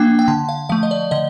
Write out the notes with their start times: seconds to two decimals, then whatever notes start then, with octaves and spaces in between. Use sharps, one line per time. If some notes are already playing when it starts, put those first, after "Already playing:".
Already playing: F3 A#3 D4 G5
0.19 G5
0.28 D3 A5
0.49 F5
0.69 F3 A3 F5
0.83 D#5
0.91 D5
1.11 D3 D#5